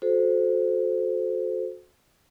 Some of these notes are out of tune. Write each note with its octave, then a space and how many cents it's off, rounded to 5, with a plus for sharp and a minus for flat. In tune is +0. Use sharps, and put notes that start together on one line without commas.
F#4 -30 A4 -25 C5 -10